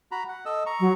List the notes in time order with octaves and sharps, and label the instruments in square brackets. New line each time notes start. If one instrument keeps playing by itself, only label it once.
[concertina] F#4 A#5 B5
F#5
A4 D#5 E6
A#5 C#6
[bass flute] F#3